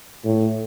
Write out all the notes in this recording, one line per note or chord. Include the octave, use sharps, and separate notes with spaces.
A2